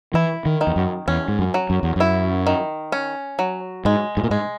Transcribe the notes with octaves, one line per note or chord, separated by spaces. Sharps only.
E3 E4
D#3
D#3
E2
F#2
E2 C#4
G#2
F#2
F#3
F#2
E2
F#2 E4
D#3
C#4
F#3
G#2 G#3
G#2
A#2
G#2 G#3